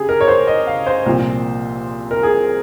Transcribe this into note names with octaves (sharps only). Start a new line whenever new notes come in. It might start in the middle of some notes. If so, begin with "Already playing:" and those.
Already playing: C#3 G4 G#4
A#4
C#5
C5
D#5
F5
C5
C2 A#2 F3
A#4
G#4